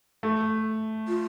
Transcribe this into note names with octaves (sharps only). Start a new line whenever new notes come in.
A3
F4